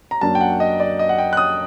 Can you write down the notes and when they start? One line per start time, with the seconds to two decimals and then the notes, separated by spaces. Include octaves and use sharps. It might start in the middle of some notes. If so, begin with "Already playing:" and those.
0.11 A#5
0.21 F#2 F#3 A#3 D4 A5
0.35 G5
0.41 F#5
0.60 D#5
0.80 D5
0.99 D#5
1.09 F#5
1.18 G5
1.33 F#6
1.37 D#6